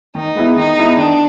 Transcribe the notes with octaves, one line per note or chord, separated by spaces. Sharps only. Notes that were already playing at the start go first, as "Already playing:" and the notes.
D#3 D#4
G#3 B3 E4
D#3 D#4
G#3 B3 E4
D#3 D4